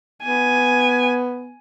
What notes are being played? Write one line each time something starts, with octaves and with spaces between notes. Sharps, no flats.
B3 G#5